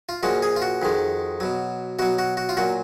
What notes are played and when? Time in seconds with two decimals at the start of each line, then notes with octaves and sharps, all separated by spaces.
0.09 F4
0.23 A#2 F3 G#3 F#4
0.42 G#4
0.56 F4
0.62 F#4
0.82 F2 D#3 G#3
1.40 B2 F#3
1.99 B2 F#3 F#4
2.19 F#4
2.37 F#4
2.49 F4
2.57 A#2 F#3 F#4